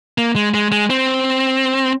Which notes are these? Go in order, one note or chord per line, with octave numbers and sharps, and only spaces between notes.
A#3
G#3
G#3
G#3
C4